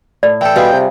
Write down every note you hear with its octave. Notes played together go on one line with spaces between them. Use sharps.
A2 D5
E3 A4 G5
B2 G3 F4 G#4
C3